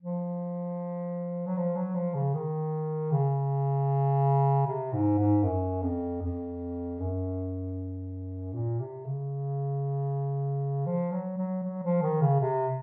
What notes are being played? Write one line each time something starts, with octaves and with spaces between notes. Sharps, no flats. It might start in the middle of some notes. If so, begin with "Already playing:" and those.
F3
F#3
F3
F#3
F3
C#3
D#3
C#3
C3
G#2
G#2
F#2
F2
F2
F#2
A#2
C3
C#3
F3
F#3
F#3
F#3
F3
D#3
C#3
C3